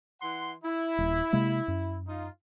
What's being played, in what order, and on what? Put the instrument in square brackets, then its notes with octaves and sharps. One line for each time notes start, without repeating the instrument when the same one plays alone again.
[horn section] E3 F#5 C6
E4
[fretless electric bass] D#1
C3 G#3 A#3
F#2
[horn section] D#4 F4